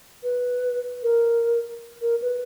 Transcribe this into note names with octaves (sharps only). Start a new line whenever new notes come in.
B4
A#4
A#4
B4